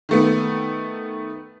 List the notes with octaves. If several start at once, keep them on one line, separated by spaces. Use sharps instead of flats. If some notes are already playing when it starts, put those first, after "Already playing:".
D#3 A3 B3